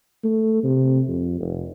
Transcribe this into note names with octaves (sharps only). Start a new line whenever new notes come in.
A3
C3
F2
F1